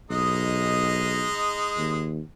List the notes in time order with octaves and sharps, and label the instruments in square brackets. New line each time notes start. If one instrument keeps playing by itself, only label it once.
[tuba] B1 [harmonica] G#3 D#4 D#5
[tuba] D#2